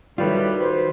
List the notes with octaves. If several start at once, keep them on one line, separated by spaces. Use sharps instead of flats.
A2 D#3 F#3 G3 F4 B4
B4 C5